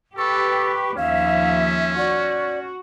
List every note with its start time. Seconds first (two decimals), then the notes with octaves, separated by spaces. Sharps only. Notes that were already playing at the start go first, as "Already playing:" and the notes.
0.17 G4 A4 B4 C#6
0.97 D#2 F3 C#4 E5 F5
1.97 F#4 D5